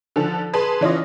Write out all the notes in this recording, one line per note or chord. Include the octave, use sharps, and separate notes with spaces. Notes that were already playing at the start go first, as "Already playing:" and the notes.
D3 F3 A4
G#4 B4 A5 C6
E3 C#4 F4 D#5